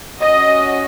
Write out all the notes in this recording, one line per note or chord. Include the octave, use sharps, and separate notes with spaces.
C#4 F#4 D#5